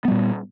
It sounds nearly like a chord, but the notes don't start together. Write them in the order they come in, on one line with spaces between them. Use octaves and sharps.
B3 G3 A#2